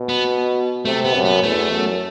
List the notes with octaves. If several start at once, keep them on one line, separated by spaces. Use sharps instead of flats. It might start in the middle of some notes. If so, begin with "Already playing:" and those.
Already playing: B2
B3
C3 A3
B3
F#2
B3
E2 A3
F#2